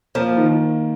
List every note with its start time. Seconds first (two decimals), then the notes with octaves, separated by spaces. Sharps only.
0.15 F3 A#3
0.37 D#3